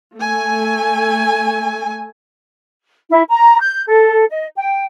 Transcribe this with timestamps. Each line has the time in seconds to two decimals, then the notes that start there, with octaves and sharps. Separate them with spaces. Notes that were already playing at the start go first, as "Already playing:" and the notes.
0.17 A3 G#5
3.10 E4
3.30 A#5
3.61 G6
3.88 A4
4.30 D#5
4.57 G5